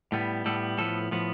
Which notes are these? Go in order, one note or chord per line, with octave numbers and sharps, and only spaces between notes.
A2 G3 B3
A2 G3 B3 A4
A2 F3 B3 A4
A2 F3 B3